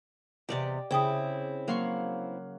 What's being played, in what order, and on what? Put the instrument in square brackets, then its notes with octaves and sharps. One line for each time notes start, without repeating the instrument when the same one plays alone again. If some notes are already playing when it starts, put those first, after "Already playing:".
[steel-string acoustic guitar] E2 A2 C3 [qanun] G4 D5 D#5
[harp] C#3 [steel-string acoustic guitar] C4 E4 [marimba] G#4 G5 D#6 [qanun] D6
[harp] F#3 F5 F#5 [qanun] A#3 C6 C#6